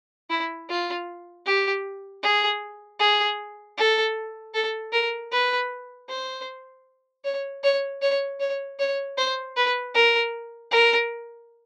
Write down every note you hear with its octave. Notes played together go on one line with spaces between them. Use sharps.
E4
F4
G4
G#4
G#4
A4
A4
A#4
B4
C5
C#5
C#5
C#5
C#5
C#5
C5
B4
A#4
A#4